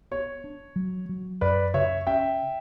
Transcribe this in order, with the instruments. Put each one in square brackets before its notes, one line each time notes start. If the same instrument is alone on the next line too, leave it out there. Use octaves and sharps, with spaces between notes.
[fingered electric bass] B3 [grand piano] C#5
[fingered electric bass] D4
F#3
F#3
[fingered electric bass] F#2 [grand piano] B4 D5
[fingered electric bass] C#3 [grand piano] C#5 E5
[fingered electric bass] C#4 [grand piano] E5 G5